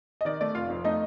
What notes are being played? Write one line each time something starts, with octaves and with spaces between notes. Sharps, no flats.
D#5
D#3 D5
A3 D5
F1 F4 F5
F2
A3 D#4 D#5